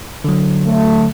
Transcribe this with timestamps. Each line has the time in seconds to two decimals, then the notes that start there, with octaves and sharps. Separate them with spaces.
0.24 D3 F#3
0.66 A3